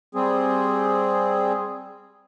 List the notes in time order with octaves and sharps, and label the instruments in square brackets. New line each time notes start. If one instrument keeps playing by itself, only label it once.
[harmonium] G3 C4 G#4